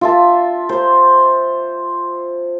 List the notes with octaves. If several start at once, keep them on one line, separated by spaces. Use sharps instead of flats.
F4 E5 A5
C5